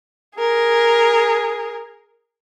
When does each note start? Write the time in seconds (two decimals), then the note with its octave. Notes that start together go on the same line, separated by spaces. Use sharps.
0.37 G#4 A#4